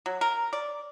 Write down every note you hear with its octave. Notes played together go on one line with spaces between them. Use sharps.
F#3
A#4
D5